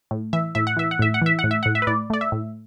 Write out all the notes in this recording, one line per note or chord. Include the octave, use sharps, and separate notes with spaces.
A2
E3 E5
A2 E5
F#5
E3 E5
F#5
A2 E5
F#5
E3 E5
F#5
A2
E5
A2 F#5
E5
B4
A2 D5
A3 D5
E5
A2